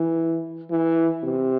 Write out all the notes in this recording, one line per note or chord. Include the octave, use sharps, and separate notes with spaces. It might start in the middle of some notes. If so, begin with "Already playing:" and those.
Already playing: E3
E3
C3